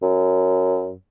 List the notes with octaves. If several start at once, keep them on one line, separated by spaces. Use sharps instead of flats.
F#2